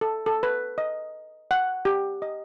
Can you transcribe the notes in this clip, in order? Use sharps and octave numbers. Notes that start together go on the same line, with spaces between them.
A4
A4
B4
D#5
F#5
G4
D#5